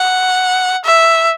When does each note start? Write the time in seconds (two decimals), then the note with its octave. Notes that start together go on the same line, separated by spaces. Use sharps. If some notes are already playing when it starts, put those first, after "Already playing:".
Already playing: F#5
0.85 E5